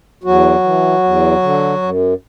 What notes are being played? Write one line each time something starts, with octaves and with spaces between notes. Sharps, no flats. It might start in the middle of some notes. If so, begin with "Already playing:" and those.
E2 F#3 F#4
E3
E2
D3
F#2